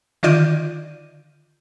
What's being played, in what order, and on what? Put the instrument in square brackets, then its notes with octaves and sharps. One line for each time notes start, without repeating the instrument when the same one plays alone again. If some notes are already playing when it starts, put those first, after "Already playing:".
[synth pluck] D3 D#3 F4 D5 G6 D#7